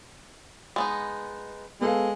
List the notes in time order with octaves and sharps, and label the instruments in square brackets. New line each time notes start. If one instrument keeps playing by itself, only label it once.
[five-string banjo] G#3 B3 D#4
[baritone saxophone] G#3 [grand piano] B3 A4 F5